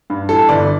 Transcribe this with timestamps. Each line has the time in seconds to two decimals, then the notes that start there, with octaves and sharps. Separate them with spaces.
0.10 G2
0.29 E3 A4
0.49 G1 D5